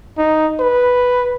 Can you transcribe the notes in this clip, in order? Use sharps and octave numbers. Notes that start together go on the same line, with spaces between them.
D#4
B4